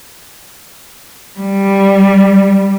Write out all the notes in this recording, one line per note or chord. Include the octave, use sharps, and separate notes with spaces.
G3